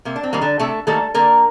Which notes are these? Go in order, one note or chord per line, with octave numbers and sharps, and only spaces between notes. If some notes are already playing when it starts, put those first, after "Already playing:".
C3 A#3
D4
C4
D#3 G3 A#3
D3 D4
C3 A3 A4
D#3 G3 A3 A#3 A4
D3 A#3 A#4